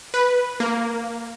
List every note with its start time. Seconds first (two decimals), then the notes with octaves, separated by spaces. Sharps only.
0.14 B4
0.60 A#3